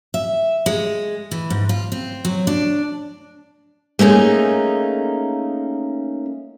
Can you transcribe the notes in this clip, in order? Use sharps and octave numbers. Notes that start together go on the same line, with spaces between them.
E5
G#3
E3
G#2
F4
C4
F#3
D4
A3 A#3 C#4 D#4 G#4